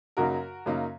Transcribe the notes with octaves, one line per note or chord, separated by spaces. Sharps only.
F#2 C#3 F#3 A#3 D#4 F#4 A#4
F#2 C#3 F#3 A#3 D#4